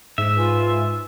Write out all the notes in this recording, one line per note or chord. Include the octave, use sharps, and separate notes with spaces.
G#2 E5
F4 B4 G#5